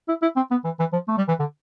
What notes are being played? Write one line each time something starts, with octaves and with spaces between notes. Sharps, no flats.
E4
E4
C4
B3
E3
E3
F3
A3
G3
E3
D3